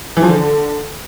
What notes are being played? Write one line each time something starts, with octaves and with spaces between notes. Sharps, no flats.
E3
F3
D3